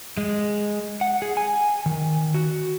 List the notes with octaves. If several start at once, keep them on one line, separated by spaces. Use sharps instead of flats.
G#3
F#5
G#4
G#5
D#3
F#4